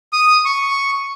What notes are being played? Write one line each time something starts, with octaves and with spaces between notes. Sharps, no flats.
D#6
C#6